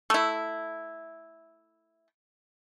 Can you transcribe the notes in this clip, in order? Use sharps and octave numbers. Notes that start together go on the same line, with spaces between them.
A3 E4